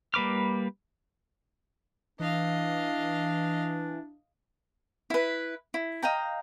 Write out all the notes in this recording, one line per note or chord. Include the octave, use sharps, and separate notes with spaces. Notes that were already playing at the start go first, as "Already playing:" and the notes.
G3 A#3 B4 D6 F6
E3 D4 D#5 F5
E4 B4
E4
D#5 F5 G5 A#5